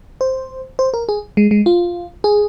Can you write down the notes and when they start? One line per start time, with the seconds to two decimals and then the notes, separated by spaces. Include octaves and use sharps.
0.21 C5
0.79 C5
0.94 A#4
1.09 G#4
1.37 G#3
1.51 G#3
1.66 F4
2.24 G#4